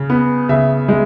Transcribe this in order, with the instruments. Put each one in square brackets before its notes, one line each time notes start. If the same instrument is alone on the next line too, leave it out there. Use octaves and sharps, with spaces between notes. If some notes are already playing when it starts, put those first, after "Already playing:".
Already playing: [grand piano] C#3
B3
C#3 E5
G#3